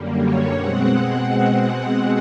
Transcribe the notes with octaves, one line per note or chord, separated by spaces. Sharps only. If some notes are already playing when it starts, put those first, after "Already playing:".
Already playing: F#2 D3 G3 A#3
C#5
B2 G#3 C4 F#5